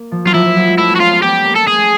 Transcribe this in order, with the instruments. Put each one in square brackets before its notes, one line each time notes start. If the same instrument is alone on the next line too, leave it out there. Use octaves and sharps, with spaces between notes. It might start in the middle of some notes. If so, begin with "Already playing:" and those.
Already playing: [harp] A#3
F3
[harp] F#3 [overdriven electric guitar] F4
[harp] F3 [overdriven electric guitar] E4
[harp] F3
F#3
G#3
[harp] A3 [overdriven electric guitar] E4
[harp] B3
[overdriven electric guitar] F#4
[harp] C#4 [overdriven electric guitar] F4
[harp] B3
[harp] B3 [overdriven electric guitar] G4
[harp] A#3
[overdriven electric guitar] A4
[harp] A3 [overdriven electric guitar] G#4
[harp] A3